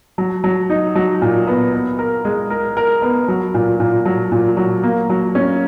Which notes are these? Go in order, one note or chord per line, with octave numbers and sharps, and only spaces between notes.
F#3
F#3
D#4
F#3
A#2
B3
B3
A#4
G#3
A#4
A#4
B3
F#3
A#2
A#2
F#3
A#2
F#3
A#3
F#3
C#4